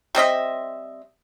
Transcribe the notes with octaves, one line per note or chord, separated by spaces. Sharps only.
G3 C4 D#5 E5